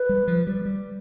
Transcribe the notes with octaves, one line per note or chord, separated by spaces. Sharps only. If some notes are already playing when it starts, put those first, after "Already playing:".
Already playing: B4
G3
F3
G3
G3